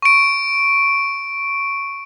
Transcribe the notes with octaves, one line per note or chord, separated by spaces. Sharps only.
C#6 D7